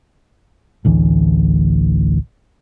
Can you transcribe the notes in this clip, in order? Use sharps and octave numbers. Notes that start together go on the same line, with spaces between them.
A1 D2 E3